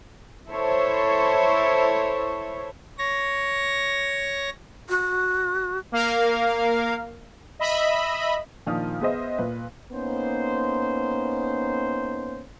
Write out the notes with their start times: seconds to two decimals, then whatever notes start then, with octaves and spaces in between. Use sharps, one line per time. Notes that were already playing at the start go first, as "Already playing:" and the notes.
0.48 E4 A4 C5 C#5
2.98 C#5 A#6
4.89 F#4
5.92 A#3 A#4 F5
7.59 D#5 E5 B5
8.67 A#2 D#3 F3 D4 D#6 F6
9.01 B3 G#4 C5 D#5 E5
9.38 A#2 B4
9.92 A#3 B3 C#4 D#4 C5